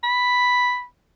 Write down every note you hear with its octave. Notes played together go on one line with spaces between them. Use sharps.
B5